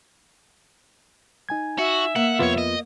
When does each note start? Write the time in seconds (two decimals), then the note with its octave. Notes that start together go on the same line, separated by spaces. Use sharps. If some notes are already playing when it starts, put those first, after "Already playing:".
1.49 D#4 G#5 G#6
1.78 F#4 E5
2.16 A#3 F#5
2.39 C2 F2 B3 F4 C#5
2.58 D#5